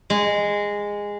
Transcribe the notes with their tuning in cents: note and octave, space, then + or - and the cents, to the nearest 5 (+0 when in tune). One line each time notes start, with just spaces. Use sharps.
G#3 -15